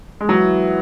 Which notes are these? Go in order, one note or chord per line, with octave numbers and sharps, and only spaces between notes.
G#3
E3 F#3 B3 E4